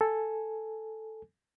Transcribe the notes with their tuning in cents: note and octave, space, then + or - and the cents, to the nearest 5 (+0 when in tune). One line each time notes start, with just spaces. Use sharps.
A4 +0 G#5 +0